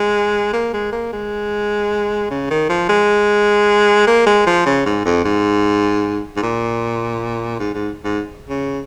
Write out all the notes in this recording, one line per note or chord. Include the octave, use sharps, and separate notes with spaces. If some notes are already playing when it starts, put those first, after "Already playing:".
Already playing: G#3
A#3
G#3
A#3
G#3
C#3
D#3
F3
G#3
A#3
G#3
F3
C#3
G#2
F2
G#2
G#2
A#2
G#2
G#2
G#2
C#3